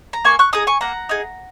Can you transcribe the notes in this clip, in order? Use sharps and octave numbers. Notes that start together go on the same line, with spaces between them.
A#5
A#3 G#5 C#6
C#6 F#6
D#4 G#4 A#5 D#6
G#5 C#6
A#3 F#5 A#5
D#4 G#4